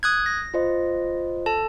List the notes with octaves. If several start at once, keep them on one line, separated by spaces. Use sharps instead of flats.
D#6 F#6 G#6
A#6
F4 C5 D#5
A4 A5